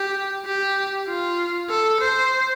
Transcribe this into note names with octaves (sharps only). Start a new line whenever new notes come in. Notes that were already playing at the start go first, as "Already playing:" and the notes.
Already playing: G4
G4
F4
A4
C5